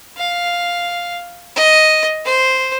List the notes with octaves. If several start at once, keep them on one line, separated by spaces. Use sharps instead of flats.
F5
D#5
C5